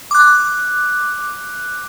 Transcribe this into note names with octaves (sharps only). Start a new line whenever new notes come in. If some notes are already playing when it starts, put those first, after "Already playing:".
D6 F#6